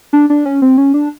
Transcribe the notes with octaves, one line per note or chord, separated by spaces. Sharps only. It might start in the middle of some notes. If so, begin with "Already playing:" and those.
D4
D4
C#4
C4
C#4
D4